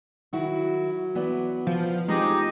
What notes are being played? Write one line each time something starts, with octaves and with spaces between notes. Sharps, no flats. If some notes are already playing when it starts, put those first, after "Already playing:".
D#3 F#3 E4 F#4
E3 B3 D5
F3
F2 G#3 D#4 G4